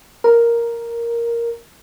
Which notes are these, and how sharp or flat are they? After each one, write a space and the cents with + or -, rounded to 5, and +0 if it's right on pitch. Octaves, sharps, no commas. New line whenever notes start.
A#4 +0